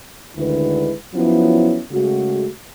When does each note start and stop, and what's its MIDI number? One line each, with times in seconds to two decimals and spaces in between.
0.36 0.92 38
0.36 0.92 50
0.36 0.92 51
0.36 0.92 56
0.36 0.92 64
0.36 0.92 71
1.15 1.79 53
1.15 1.79 54
1.15 1.79 59
1.15 1.79 61
1.15 1.79 64
1.91 2.48 49
1.91 2.48 56
1.91 2.48 57
1.91 2.48 66